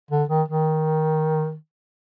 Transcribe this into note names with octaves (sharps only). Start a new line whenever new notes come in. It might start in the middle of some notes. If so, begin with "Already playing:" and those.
D3
D#3
D#3